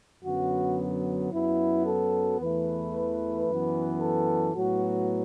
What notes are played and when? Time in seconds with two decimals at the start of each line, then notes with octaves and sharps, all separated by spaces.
0.25 F#2 D3 F#3 B3 F#4
1.32 F#2 F#3 B3 E4
1.86 A4
2.40 E2 E3 A3 B4
3.48 F#2 E3 B3
4.01 A4
4.55 A2 F#3 B3 F#4